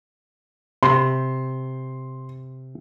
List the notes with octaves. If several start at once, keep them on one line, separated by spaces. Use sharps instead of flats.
C3 C6